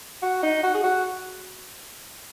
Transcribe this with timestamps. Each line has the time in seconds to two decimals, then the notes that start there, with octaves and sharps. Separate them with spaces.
0.22 F#4
0.43 D#4
0.63 F#4
0.74 G#4
0.83 F#4